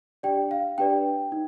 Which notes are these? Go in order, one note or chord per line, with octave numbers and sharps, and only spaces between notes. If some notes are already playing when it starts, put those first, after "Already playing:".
D4 G4 D5 G5
F5
D4 G4 B4 D5 G5
D#4